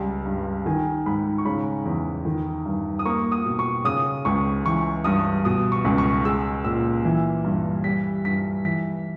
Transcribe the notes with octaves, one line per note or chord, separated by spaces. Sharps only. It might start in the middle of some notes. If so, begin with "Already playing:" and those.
Already playing: C#2 G3
G2
D#3 G#5
G#2 B5
C#6
C#3 B5
E2
D#3
G2
D#6
A#3 C#6
D#6
B2
C#6
C#3 D#6
C#2 C#6
E3 C#6
G2 D#6
B2 D#6
C#6
C#2
C#6
G#3 E6
A#2 E6
E3
G2
G3 B6
G2 B6
E3 B6